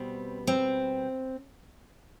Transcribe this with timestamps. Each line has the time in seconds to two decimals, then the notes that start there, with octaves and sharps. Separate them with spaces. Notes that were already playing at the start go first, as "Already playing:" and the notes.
Already playing: B2 G3 B3 C4
0.47 C4